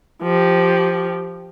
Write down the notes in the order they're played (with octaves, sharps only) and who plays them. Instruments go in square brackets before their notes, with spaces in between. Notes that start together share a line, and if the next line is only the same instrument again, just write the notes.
[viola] F3 G4